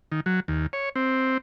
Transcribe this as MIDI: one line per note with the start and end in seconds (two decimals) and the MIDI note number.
0.12 0.20 51
0.26 0.40 54
0.48 0.67 39
0.73 0.89 73
0.95 1.38 60